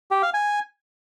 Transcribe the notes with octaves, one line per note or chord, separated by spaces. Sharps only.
G4
F5
G#5